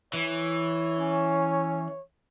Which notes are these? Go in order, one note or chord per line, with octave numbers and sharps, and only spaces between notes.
E3 C#5
C#4